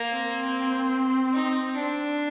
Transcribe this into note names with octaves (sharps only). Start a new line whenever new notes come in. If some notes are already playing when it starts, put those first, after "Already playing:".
Already playing: A#3
C4
D#4
D4